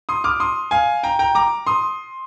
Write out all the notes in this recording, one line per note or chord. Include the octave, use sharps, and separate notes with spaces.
C6 D#6
D6 F6
C6 D#6
F5 G#5
G5 A#5
G5 A#5
A#5 D6
C6 D#6